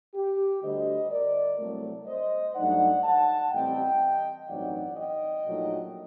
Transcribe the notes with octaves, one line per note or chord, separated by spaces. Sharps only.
G4
D2 D3 G3 C5 D#5
A#4 D5
C2 C3 F#3 A3
C5 D#5
G2 F#3 A3 D#4 D5 F#5
F#5 A5
A1 A2 G3 C4 D#5 G5
A1 G2 F#3 C4 D#4 D5 F#5
D#5 G5
A#1 A#2 F#3 A3 D#4